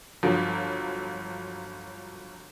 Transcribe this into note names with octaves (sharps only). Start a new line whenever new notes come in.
G1 F3 F#3